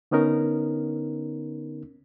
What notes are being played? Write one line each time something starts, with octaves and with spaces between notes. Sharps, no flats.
D3 B3 C#4 D#4 A#4